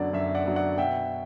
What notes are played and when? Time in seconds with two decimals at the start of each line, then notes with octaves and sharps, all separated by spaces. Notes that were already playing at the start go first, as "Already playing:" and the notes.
Already playing: F#2 D3 F#3 B3 D5
0.13 F#2 E5
0.35 D5 F#5
0.46 D3 F#3 B3
0.56 D5 F#5
0.78 B2 E5 G5